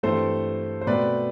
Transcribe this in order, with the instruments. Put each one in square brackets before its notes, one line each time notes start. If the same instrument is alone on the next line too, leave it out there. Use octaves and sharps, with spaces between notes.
[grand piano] G2 E3 A3 C4 A4 C5
C5
B2 A3 C4 B4 D5